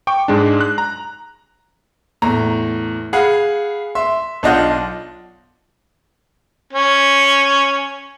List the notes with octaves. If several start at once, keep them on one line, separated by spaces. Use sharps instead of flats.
G5 C#6 D6
G#2 G#3 D4
F#6
A#5
E2 A2 A#5
G#4 F5 F#5 B5
E5 C6
B1 D4 F4 D#5 F#5 G6
C#4